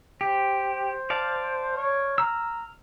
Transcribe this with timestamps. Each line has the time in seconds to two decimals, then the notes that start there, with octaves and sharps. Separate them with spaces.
0.21 G4 C5
1.10 D5 F5 A5
1.77 C#5
2.18 A#5 E6 F6